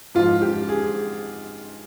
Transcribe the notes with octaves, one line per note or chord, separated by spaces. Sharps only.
G#2 F3 F4
G4
G#4